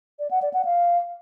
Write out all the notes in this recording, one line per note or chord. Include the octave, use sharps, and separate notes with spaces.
D5
F#5
D5
F#5
F5